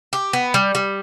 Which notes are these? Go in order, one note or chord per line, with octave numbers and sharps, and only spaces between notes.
G4
B3
G3
G3